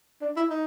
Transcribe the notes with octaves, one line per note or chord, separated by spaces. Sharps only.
D4
E4
D#4